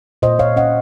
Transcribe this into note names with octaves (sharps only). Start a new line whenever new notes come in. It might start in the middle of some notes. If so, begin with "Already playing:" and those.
A#2 C5 D#5
A#2 C#5 F5
C#4 D#5 F#5